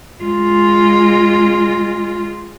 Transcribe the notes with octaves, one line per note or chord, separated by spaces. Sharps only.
G#3 F4